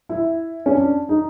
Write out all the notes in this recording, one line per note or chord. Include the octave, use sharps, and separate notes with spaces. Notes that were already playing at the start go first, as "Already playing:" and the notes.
E4
C#4
D4
D#4